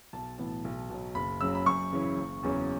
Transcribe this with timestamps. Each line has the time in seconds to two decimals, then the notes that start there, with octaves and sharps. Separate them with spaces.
0.13 B1 A5
0.38 A2 E3 B3
0.64 B1
0.90 B2 F#3
1.15 F#1 B5
1.41 F#2 C#3 F#3 E6
1.55 B5
1.66 F#2 C#6
1.92 C#3 E3 C#4 E4
2.17 F#1
2.43 E2 C#3 F#3 C#4